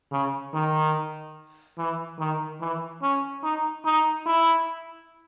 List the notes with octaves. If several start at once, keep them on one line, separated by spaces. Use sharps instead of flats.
C#3
D#3
E3
D#3
E3
C#4
D#4
D#4
E4